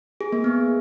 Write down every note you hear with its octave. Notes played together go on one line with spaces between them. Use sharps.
G#4
A#3
B3